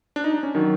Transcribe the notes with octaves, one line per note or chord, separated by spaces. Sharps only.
D4
D#4
D4
C#4
D#3 F#3